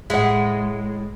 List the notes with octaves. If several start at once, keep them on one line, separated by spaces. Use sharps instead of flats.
A2 G#3 E5 F#5